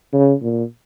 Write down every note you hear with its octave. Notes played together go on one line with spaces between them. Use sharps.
C#3
A#2